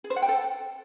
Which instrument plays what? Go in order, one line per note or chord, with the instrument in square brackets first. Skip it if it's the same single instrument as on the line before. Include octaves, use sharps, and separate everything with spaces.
[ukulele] G#4
C5
F#5
G5
A4